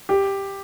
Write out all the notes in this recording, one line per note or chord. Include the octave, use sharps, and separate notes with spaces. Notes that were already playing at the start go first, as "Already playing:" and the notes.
G4